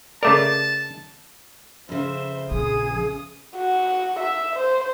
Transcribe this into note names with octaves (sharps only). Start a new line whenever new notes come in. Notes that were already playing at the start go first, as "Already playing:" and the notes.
C#3 A3 A#4 D5 A5 D6
F2 C#3 C5 E5
A#1 F3 G#4 D#6
F#4
E5
C5